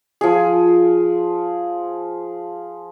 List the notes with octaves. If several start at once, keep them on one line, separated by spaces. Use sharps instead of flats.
F3 G#4